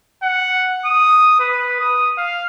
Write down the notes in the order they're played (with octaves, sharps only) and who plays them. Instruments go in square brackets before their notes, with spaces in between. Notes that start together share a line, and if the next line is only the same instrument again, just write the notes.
[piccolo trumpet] F#5
D#6
B4
D#6
F5